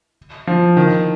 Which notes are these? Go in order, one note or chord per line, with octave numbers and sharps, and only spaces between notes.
F3
D#3